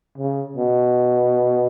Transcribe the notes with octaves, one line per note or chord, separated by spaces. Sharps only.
C#3
B2